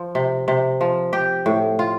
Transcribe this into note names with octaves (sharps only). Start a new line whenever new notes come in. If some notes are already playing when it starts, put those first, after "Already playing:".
Already playing: F3
C3
C3
F3
G4
A2
F4